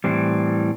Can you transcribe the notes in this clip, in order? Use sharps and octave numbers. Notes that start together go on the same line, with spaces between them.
A2 E3 G3 C4